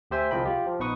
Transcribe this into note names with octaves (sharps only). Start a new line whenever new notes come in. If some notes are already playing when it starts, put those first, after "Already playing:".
D2 G4 C5 E5 G#5
C2 F3 G#4 D#5 G5 B5
F4 G4
F3
A#1 B3 D#4 B4 C#6 D#6